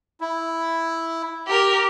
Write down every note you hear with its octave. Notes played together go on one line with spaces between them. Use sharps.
E4
G4 A#4